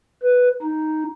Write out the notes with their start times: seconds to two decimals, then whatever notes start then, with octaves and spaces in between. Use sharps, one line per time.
0.22 B4
0.62 D#4